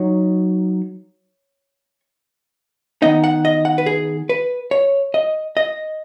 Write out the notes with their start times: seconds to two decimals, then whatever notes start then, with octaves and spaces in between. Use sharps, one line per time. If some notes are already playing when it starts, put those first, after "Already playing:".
Already playing: F#3 D#4 C#5
3.02 D#3 B3 D#4 D#5
3.24 F#5
3.45 D#5
3.65 F#5
3.78 B4
3.86 G#4
4.29 B4
4.71 C#5
5.14 D#5
5.57 D#5